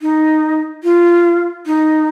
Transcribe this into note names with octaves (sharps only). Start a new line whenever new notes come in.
D#4
F4
D#4